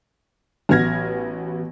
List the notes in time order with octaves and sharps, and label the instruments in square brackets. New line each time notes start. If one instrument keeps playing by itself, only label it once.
[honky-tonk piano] A1 F#3 B3 F6 G#6 A#6